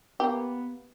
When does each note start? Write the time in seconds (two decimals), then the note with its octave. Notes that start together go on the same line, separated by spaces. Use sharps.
0.20 A#3 B3 G4